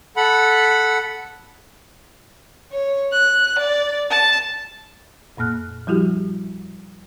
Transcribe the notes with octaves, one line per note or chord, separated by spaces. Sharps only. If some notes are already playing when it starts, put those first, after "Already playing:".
A4 F#5 B5
C#5
F#6
D5
A5
F2 A#2 A#3 F6 F#6
F3 G3 E4 F#4 G4